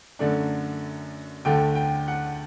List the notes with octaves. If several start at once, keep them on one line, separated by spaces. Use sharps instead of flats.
F#2 D3 A3 D4
D2 D3 A3 G5
G5
F#5